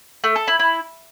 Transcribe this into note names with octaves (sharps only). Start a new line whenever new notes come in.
A3
A4
E4
E4